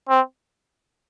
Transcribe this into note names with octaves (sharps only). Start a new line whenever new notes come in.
C4